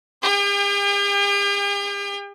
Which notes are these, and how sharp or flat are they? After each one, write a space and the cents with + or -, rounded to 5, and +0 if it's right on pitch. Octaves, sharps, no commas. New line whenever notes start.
G4 +45 G5 +40